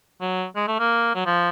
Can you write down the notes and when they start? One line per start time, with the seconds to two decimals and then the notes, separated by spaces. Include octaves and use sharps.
0.21 F#3
0.56 G#3
0.68 A3
0.79 A#3
1.15 F#3
1.26 F3